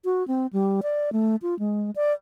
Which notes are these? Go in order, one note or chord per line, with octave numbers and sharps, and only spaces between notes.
F#4
C4
G3
D5
A3
F4
G#3
D5